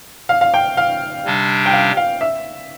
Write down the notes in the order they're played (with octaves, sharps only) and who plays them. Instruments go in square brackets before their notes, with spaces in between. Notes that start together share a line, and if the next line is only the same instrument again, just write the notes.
[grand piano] F5
F5
G5
F5
[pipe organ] C3 G3 D4
[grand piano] G5
F5
F5
E5